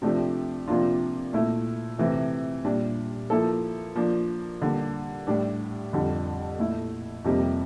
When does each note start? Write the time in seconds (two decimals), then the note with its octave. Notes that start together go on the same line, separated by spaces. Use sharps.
0.02 C3 F3 A3 D4 G4
0.68 C3 F3 A#3 D4 F4
1.33 A#2 A3 E4
1.98 C3 E3 A3
2.64 A#2 G3 D4
3.30 F3 A#3 E4 A4
3.96 F3 A#3 D4
4.62 D3 G3 A#3
5.27 A2 G3 D4
5.93 F2 D3 G3
6.58 A#2 A3 E4
7.24 F2 C3 G3 A#3